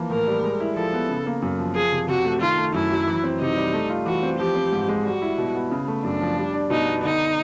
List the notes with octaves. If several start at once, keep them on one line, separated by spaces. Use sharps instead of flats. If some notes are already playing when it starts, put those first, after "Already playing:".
Already playing: E3 F3 A#3
A2 A#4
G3
G#3
E4
F3 A4
B3
C#3
A#3
F#2
F3
F3 G#4
C3
C3 F#4
A3
D#3 F4
A3
F#2 E4
F#3
E3
C4
C3 D#4
G3
A3
F4
E3 F#4
C4
F3 G4
C4
G#2
G#3
G3 F#4
E4
B2
B3
C#3
A3
F#2 D4
F3
G3
D4
B2 D#4
B3
D3 D#4